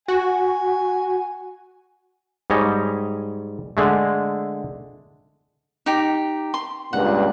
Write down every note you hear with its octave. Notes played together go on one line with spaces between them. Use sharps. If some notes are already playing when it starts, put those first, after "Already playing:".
F#4 G#5
G#2 G3 C#5 D#5 G#5
D3 G#3 A3
D#4 G4
C6
C#2 G2 A#2 F#5